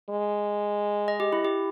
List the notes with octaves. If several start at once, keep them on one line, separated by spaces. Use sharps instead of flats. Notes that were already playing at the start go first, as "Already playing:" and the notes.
G#3
D#5
G4
E4
G4